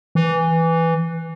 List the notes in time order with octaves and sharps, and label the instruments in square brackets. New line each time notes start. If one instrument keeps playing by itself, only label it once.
[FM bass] E3